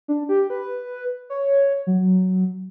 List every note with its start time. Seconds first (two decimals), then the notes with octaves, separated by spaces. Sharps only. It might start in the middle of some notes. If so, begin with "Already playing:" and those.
0.08 D4
0.29 G4
0.50 B4
1.30 C#5
1.87 F#3